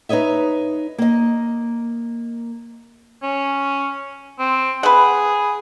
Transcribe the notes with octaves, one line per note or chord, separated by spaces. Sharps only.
D#4 B4 C#5 D#5 E5
A#3 D#5
C#4
C4
G#4 B4 F#5